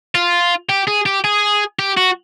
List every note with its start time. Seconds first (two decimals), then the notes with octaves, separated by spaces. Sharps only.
0.15 F4
0.69 G4
0.88 G#4
1.06 G4
1.24 G#4
1.79 G4
1.97 F#4